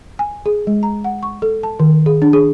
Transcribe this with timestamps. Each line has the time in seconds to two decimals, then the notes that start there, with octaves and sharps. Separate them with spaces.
0.19 G#5
0.46 G#4
0.67 G#3
0.83 A#5
1.04 F#5
1.23 C#6
1.42 A4
1.63 A5
1.79 D#3
2.06 G#4
2.22 D4
2.33 G#4